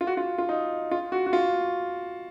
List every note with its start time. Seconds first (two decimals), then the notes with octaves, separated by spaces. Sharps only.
0.01 F4
0.07 F#4
0.17 F4
0.38 F4
0.49 D#4
0.91 F4
1.12 F#4
1.26 F#4
1.33 F4